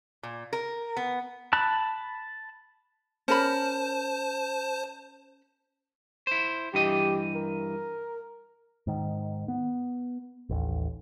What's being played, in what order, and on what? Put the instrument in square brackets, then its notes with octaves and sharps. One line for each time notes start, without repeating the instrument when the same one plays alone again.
[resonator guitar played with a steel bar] A#2
A#4
B3
[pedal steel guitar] A5 B5 F#6
[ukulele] C#4 A#4 B5 [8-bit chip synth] C5 A5
[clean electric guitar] E4 C5
[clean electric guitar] G2 E3 D#5 [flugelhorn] G4
[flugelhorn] A#4
[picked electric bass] G#2 D#3
B3
A1 D#2